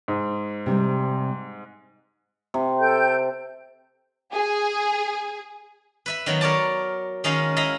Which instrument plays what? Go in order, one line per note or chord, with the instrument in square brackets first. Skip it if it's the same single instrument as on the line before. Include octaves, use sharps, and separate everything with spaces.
[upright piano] G#2
[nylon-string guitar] C3 G3
[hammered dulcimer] C3
[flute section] A4 G5 G6
[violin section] G#4
[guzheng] B4 E5 B5
D#3 F#3 B3
A#4 C#5 D5 A5
D#3 G#3 C#4 D#4 D#5 F5
E4 D#5 F5 A#5 B5